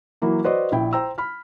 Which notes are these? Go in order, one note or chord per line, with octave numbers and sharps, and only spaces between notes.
E3 F#3 A#3 E4
F#4 B4 C5 D5 D#5
A#1 E4 G5
C5 G5 A#5 E6
B5 F6